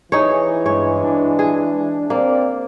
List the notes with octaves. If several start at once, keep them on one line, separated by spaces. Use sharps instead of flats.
E3 D#4 G#4 C#5
G2 G#3 C#5
D4
G#4
A#3 C4 D5